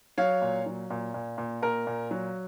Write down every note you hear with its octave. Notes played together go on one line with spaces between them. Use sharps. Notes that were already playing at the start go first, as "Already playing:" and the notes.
F#3 C#5 F5
A#2
F#3
A#2
A#2
A#2
A#2 A#4
A#2
F#3